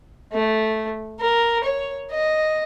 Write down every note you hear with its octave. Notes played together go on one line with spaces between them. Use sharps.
A3
A#4
C#5
D#5